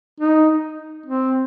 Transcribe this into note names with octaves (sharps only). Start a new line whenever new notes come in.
D#4
C4